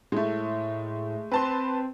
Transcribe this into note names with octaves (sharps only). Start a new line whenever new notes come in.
A2 G#3 A3
C4 B4 A5 C6